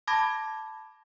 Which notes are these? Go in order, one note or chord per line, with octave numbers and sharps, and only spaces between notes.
A5 B5 D6 G#6 A#6